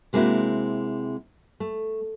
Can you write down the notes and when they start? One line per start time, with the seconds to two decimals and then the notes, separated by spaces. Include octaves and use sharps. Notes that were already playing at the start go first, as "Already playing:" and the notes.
0.13 C3 G#3 A#3 C4 E4 F#4
1.60 A3